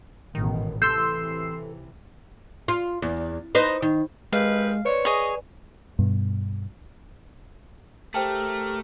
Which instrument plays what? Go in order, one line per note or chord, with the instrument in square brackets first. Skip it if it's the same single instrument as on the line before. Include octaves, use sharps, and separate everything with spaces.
[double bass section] A1 G#2 B2 [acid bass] D#3
[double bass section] C3 E3 [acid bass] A4 [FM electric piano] C6 E6 C7 [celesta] G6
[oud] F4
E2
D#4 B4 C5
D#3
[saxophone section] C3 D#3 B4 [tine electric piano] G#3 [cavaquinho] F5
[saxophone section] C4 C#5 [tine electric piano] B4 D5
[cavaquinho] G#4 C#5 [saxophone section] D#5
[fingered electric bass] G2 B2
[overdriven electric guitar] A3 [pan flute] G4 [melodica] A#4 [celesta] C5 G5 A5